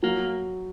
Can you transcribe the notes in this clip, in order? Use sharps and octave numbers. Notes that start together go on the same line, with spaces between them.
F#3 A#3